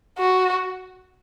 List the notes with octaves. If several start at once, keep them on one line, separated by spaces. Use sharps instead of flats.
F#4